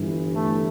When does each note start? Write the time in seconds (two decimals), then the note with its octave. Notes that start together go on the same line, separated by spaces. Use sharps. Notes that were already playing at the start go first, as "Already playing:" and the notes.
Already playing: G1 G2 E3
0.35 A3